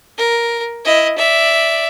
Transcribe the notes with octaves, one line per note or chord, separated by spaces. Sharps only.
A#4
E4 D#5
D5 E5